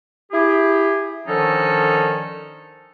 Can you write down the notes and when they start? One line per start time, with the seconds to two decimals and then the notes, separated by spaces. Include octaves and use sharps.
0.32 E4 G4 G#4
1.27 D3 D#3 F3 C#4 D#4 A4